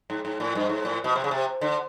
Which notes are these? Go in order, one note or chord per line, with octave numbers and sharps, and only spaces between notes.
G#2
G#2
A2
G2
G#2
A2
B2
C3
C#3
C3
D3